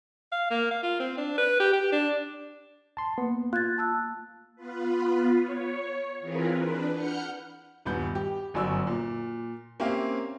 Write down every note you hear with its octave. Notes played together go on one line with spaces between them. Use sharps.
F5
A#3
F5
F4
C4
D4
B4
G4
G4
D4
A5 C6
A#3 B3
F4 F#6 G#6 A6
A5 E6 F#6
B3 F4 B4
C#5
E3 C4 F4 G#4 A#4 B4
D4 B4
F#5 F6 G6 C#7
D#1 G2 B3 G6
G4
G1 F#2 F#4 D5 E6
A#2
A#3 C4 C#4 G4 E5 F5